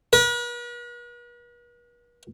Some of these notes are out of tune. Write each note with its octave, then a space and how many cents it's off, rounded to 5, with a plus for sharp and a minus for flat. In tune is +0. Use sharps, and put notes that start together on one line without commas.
B4 -45